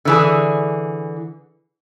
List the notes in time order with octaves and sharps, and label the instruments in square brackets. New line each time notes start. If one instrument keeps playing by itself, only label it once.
[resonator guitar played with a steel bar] D3 E3 G#4